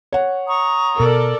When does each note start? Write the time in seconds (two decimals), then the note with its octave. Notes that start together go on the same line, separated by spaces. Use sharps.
0.13 C#5 F#5
0.47 A#5 C#6 D#6
1.00 B2 A4 A#4 D5